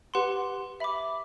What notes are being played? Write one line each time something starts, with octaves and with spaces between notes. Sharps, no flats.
G4 B4 F#5 C6
E5 B5 D6